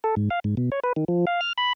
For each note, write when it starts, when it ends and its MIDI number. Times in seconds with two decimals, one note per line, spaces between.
0.04 0.15 69
0.16 0.29 44
0.30 0.40 77
0.44 0.55 44
0.57 0.70 47
0.72 0.80 73
0.84 0.93 71
0.96 1.05 51
1.08 1.25 53
1.27 1.41 77
1.41 1.53 89
1.58 1.73 83